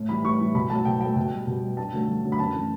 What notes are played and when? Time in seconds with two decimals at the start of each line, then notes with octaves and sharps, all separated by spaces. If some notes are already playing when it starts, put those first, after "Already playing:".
Already playing: A2
0.09 E3 G3 B5
0.24 A2 C#6
0.39 E3 G3
0.55 B2 B5
0.70 F#3 A3 A5
0.85 B2 G5
1.01 F#3 A3 G5
1.16 B2
1.32 G3
1.47 B2
1.62 G3
1.77 G2 A5
1.93 D3 F#3 A3
2.08 G2
2.23 D3 F#3 A3
2.32 B5
2.39 F#2 A5
2.54 E3 A3